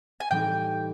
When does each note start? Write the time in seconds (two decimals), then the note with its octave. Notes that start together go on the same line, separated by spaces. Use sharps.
0.20 G#5
0.31 A2 E3 G3 C4 D#4 G5